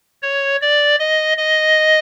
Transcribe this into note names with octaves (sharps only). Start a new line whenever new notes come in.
C#5
D5
D#5
D#5